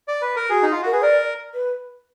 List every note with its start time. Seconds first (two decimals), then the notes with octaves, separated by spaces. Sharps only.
0.08 D5
0.22 B4
0.36 A#4
0.50 F#4 G#4
0.63 D#4
0.72 F4
0.82 F#4 A#4
0.92 G#4 B4
1.02 A#4 D5
1.54 B4